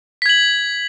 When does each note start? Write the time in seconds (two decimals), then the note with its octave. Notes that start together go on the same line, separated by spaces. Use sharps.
0.22 B6
0.26 G#6
0.29 F#7